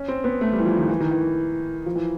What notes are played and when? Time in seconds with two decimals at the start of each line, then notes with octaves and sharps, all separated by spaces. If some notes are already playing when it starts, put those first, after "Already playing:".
Already playing: C#4
0.08 C4
0.24 B3
0.41 A3
0.53 G3
0.59 E3
0.65 F3
0.77 D#3
0.89 E3
1.00 D#3
1.11 E3
1.86 F3
1.96 E3